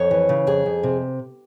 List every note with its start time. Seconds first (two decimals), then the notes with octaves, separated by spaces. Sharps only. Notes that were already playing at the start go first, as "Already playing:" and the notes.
Already playing: F2 C#5
0.11 E3
0.29 C#3
0.47 F2 G#4
0.66 F2
0.83 C3